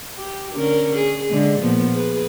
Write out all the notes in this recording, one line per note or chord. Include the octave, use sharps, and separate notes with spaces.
G4
D3 C#4 A#4
G#4
D3 G#3
A#2 F3 B3
G#4 B4